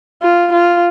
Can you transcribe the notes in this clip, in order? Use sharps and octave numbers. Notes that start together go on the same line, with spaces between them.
F4
F4